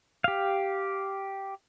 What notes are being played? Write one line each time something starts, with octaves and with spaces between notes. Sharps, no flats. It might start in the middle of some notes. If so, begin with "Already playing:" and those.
G4 F5